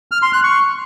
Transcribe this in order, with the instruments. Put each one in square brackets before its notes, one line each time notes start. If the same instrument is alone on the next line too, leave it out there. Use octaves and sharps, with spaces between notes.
[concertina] F6
C6
F#6
C#6